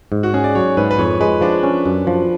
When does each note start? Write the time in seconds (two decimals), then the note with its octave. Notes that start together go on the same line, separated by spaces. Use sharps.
0.12 G#2
0.23 F#4
0.34 C#4 G#4
0.44 D5
0.55 F#3 C#5
0.77 G#2 B4
0.91 B4
0.98 F2 C#5
1.21 G#3 B4
1.41 F3 D4
1.63 C#4
1.86 F#2
2.07 F3